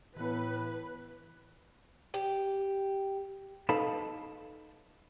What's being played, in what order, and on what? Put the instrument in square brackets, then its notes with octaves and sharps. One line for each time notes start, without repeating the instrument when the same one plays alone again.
[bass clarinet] A2 [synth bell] E3 B3 [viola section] B4
[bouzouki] G4
[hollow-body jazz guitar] D#4 A4 B4 F5 A5 B5